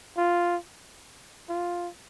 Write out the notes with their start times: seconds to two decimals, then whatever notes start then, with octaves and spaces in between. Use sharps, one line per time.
0.18 F4
1.49 F4